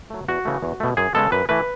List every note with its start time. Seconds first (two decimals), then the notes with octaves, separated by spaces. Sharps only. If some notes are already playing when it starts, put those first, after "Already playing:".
0.10 F#3 A3
0.28 E2 F#4
0.45 C#3 E3 A3
0.63 E2
0.80 B2 A3
0.97 F#2 G#4
1.15 C#3 G#3 B3 A4
1.32 F#2 B4
1.49 E3 A3 B4